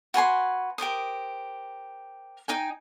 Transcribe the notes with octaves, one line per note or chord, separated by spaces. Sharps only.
F#4 B4 G#5 C6
G4 A#4 C5 D#6
D#4 G5 G#5